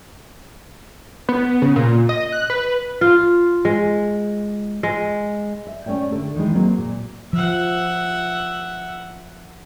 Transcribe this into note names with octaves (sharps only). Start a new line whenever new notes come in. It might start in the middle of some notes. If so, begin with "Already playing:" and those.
B3
C#3
A#2
D#5
F#6
B4
F4
G#3
G#3
E5
A3 C#4 C#5 D5 G5
D3 A4
D#3 E3 G#3 D#4
F#3 A#3 C4
A#2
F3 E5 F#5